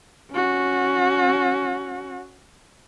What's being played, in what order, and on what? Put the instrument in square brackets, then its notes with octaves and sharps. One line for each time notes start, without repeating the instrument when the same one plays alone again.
[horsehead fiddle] C#4 F#4